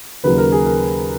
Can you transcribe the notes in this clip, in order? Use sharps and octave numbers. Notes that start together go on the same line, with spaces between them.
D#2 C#3 F#3 B4
A#4
G#4
A#4